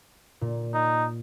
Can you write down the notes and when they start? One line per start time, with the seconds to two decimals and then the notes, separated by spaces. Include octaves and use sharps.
0.41 A#2
0.74 D#4